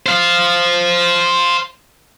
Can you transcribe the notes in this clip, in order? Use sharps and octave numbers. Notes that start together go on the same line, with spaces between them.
C5 F5